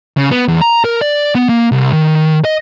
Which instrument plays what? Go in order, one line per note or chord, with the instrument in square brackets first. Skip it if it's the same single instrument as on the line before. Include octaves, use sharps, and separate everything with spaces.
[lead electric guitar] C#3
B3
E2
A#5
A#4
D5
B3
A#3
C2
D#3
D#5